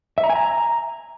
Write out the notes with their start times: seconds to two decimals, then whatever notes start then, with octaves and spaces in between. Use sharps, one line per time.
0.18 E5
0.24 A#5
0.30 G#5
0.35 A#5